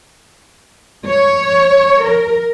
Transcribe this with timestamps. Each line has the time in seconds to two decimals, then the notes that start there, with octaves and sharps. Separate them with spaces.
1.07 C#5
2.03 A#4